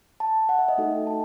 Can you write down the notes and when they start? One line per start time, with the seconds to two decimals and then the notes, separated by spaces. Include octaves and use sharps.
0.20 A5
0.49 F#5
0.59 E5
0.68 D#5
0.78 A3 D#4 F#4 A4 E5
0.92 G5
1.07 A5